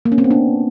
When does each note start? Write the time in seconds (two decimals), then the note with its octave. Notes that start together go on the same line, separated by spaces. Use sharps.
0.05 A#3
0.12 C#4
0.18 C4
0.24 B3
0.31 D4